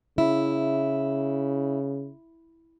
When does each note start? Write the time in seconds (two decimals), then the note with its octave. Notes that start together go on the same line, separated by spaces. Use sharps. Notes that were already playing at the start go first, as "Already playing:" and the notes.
0.18 C#3 E4